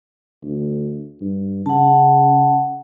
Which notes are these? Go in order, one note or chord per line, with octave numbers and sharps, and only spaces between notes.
D2
G2
C#3 F#5 A5